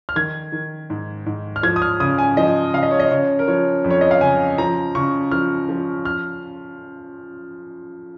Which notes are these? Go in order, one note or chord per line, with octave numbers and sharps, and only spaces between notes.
F6
D#3 G#6
D#3
G#2
G#2
F6
F3 G#6
D#6
F6
C#3 D#6
G#5
F3 D#5
C#3 F5
D#5
C#5
D#5
C#3 C#5
A#4
F3 C#5
F2
C#5
D#5
F5
C#3 G#5
F3 A#5
C#3 C#6
F3 F6
F3
F6